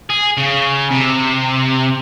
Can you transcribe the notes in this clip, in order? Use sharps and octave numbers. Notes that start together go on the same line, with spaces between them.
G#4
C#3
C3